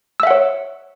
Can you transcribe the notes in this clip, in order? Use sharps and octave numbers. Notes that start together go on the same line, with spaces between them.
C#5 E5 F#5 E6